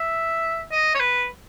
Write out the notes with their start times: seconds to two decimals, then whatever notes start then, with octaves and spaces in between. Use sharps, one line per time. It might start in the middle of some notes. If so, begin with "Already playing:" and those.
Already playing: E5
0.71 D#5
0.95 C#5
1.00 B4